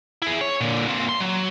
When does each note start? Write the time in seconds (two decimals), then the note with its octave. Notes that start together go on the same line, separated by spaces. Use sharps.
0.22 E4 G#4
0.41 C#5
0.61 A#2 D3
0.88 A#2 C4
1.09 C6
1.20 F#3